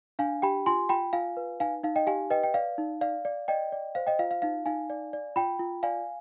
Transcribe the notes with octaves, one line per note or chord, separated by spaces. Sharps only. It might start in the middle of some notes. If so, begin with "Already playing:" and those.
D4 F5 G#5
G4 G5 B5
F4 G#5 C6
F4 G5 B5
F4 F5 G#5
B4
D#4 F5 G#5
D#4 F5
D#5 G5
G4 F5 G#5
B4 D#5 G5
G5
D5 F5
D#4
D5 F5
D5
D5 D#5 G5
D5
C5 F5
D#5 G5
F4 F5
F5
D#4 F5
D#4 F5 G#5
D5
D5
F4 G5 B5
F4
D5 F5 G#5